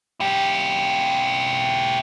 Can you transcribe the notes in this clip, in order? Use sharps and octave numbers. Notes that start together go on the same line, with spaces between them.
E4 G4